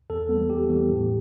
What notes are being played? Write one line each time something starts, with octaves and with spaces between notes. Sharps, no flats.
E2 A4
E3 G3 B3
E2 G4
E3 G3 B3
A2